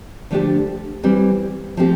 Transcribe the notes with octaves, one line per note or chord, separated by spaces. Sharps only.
D3 F3 A3 D4 G4
E3 G3 C4
F3 A3 C4 G4